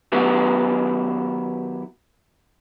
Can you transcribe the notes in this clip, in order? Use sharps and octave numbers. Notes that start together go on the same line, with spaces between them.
D#3 F#3 B3 E4 G4 B4